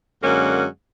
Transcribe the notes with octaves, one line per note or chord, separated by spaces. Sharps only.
F#2 D3 G#3 A#3 C#4 F#5